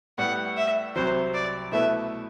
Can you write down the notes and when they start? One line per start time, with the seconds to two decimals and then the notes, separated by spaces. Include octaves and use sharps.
0.18 A2 G3 B3 F#5
0.57 E5
0.96 C2 C3 F#3 C5
1.34 D5
1.72 B2 A3 E4 B4 E5